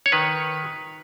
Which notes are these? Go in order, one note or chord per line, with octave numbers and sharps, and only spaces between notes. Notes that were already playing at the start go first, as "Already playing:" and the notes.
C#5
D#3 B4